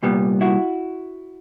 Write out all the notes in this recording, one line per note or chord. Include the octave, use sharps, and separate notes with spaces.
C2 A#2 G3 B3
E4 F#4